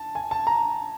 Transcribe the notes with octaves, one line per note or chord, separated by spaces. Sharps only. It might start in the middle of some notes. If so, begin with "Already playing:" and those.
Already playing: A5
G#5
A5
A#5